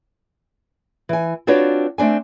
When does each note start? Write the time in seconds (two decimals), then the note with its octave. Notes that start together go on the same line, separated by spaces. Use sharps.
1.09 E3 G#5
1.47 C4 D4 F4 F#4 B4 C#5
1.98 A3 C4 D4 G#5